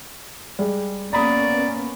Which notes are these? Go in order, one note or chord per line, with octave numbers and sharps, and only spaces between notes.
G3 G#3
A#3 B3 C#4 D5 A#5 B5 D#6